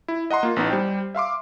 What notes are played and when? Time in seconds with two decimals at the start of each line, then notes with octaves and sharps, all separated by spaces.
0.08 E4
0.31 D#5 F#5 A#5 C6
0.43 A#3 F4
0.56 A1 B3 D#4
0.70 G3 C5 G5
1.15 E5 F5 C6 D6